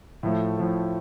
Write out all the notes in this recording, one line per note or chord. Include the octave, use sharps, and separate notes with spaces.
A2 F3 A3
A2 F3 A3